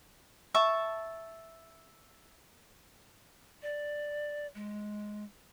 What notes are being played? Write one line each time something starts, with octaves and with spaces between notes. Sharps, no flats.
E5 A5 C#6
D5
G#3